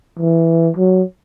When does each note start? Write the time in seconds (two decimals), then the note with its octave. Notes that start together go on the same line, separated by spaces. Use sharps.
0.19 E3
0.77 F#3